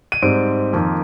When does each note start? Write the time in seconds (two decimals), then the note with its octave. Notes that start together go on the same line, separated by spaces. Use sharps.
0.12 D#7
0.22 G#2 G3 C4 D7
0.73 F2 D#3 A#3